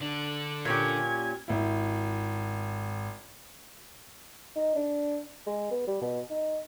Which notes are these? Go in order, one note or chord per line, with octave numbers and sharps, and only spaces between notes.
D3 D4 F#7
A#2 C#4 G4 G#6
G#1 E4
D#4
D4
G#3
B3
G3
B2
D#4